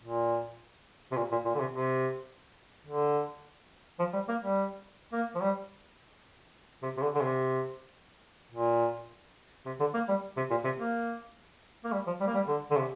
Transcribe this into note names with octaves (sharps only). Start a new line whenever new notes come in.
A#2
C3
A#2
A#2
A#2
D3
C3
C3
D3
F3
G3
A#3
G3
A#3
F3
G3
C3
C3
D3
D3
C3
A#2
C3
D3
A#3
G3
C3
A#2
C3
A#3
A#3
G3
F3
G3
A#3
G3
D3
D3
C3